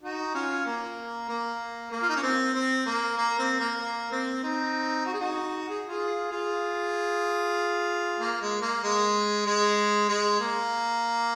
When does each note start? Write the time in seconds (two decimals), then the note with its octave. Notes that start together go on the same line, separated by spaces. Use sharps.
0.03 D#4 F#4
0.34 C#4 F4
0.66 A#3
1.29 A#3
1.91 A#3
2.02 F4
2.09 D#4
2.16 C#4
2.23 C4
2.54 C4
2.86 A#3
3.18 A#3
3.39 C4
3.59 A#3
3.80 A#3
4.12 C4
4.43 C4 D#4
5.06 F#4
5.13 G#4
5.20 D#4 F#4
5.69 G#4
5.89 F4 G#4
6.31 F4 G#4
8.20 A#3
8.41 G#3
8.62 A#3
8.83 G#3
9.46 G#3
10.09 G#3
10.40 A#3